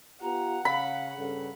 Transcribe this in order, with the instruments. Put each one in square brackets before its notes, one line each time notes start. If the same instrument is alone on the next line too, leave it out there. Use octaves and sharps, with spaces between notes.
[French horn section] B3 F4 G4 [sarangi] F#5 [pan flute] A#5
[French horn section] C#3 [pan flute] F5 [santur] B5
[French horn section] G2 C#3 [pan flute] A4